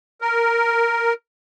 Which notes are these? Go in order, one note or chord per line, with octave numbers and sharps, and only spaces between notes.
A#4